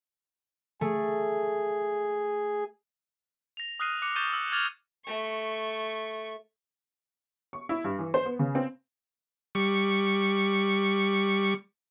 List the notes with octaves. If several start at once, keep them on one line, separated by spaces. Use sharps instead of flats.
A3 G#4
A#6 F7
D#6 F6 F#6 A#6 C7 D#7
D6 F#6 C#7
C#6 G6 A6 D#7 E7 G7
E6
D6 F6 G#6 A6 C#7 F7
A3 C#6
C#6
E4
G2
E3
C5
B3
C#3
C4
G3 C#6